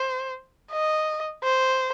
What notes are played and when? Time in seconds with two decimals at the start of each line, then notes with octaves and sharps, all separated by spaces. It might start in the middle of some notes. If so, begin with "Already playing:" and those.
Already playing: C5
0.72 D#5
1.44 C5